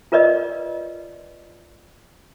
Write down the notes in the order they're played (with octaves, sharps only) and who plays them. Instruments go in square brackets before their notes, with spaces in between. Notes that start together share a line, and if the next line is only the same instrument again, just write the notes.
[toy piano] F4 A#4 B4 D5 D#5